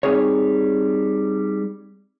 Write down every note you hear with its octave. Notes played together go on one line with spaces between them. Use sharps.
G3 C4 D#4 G#4 A#4 C#5